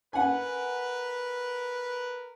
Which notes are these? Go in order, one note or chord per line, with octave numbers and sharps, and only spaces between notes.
A#4 B4 F#5 G#5